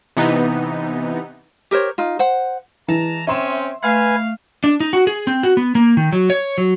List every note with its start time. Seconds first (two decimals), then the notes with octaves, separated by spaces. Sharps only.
0.17 C3 E3 B3 D#4
1.71 G4 A#4 C5 C#5
1.98 D#4 F4
2.19 C5 F#5
2.88 E3 G#3 A5 A#5
3.27 C4 C#4 E5 C6 E7
3.83 A3 B4 F5 G#5
4.64 D4
4.80 D#4
4.93 F#4
5.07 G#4
5.27 C4
5.43 F#4
5.57 B3
5.75 A#3
5.97 D#3
6.12 F#3
6.30 C#5
6.58 F#3